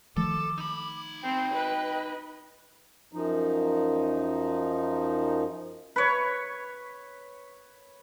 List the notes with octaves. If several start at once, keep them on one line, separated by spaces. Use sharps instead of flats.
D#3 F3 A3 A4 D6
D#4 B5
C4 G5
B4 D#5
F#2 F3 D#4
B4 C#5